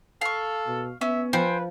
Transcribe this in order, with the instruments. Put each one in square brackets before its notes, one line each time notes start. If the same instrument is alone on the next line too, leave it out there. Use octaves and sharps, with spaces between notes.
[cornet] A4 [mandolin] F5 C#6
[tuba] B2
[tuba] B3 [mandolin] C#4 [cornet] E5
[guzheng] F3 [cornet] B4 [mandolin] C5 G5 G#5